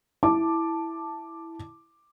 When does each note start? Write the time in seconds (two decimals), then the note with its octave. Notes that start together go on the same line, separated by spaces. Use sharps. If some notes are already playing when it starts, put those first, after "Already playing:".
0.23 E4 A5 D6